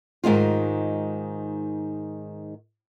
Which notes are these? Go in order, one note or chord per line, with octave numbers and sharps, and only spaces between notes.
G#2 D#3 G#3 F4